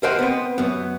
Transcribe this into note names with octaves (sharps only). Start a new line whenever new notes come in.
A#4 C5 D#5 F#5 G5 C6
B3 C4
F#2 B3